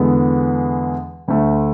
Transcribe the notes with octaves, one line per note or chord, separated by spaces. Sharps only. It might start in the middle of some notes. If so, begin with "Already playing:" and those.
Already playing: E2 D3 G#3 B3
D2 D3 A3